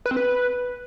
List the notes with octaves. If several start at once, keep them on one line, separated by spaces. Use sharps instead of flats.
B4
C4
B4